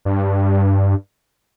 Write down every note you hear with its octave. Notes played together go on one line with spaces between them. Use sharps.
G2